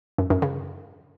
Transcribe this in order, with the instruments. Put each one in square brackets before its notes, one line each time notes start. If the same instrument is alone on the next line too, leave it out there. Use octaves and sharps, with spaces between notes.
[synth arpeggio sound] F#2
F#2
C#3